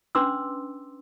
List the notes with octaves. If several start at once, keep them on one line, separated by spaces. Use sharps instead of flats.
C#4 D4 B4 C6 D6 E6